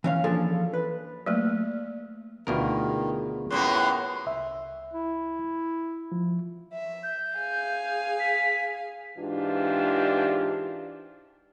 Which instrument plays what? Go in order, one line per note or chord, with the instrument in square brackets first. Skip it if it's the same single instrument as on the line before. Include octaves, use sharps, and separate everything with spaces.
[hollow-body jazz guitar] E3 C#4 F5
E3 F3 A#3 D4 G#4 A4
B4
[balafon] F#3 A3 A#3
[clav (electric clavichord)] D2 B2 A#4 [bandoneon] D#3 [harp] B3 F4 G#4
[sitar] F#2 A2 A#3 [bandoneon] B4 C6
[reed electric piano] C2 E5
[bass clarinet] E4
[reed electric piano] F3
[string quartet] E5
[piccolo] G6
[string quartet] G#4 F5 G#5
[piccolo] B6
[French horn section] G#2 E3 D4 F4 G4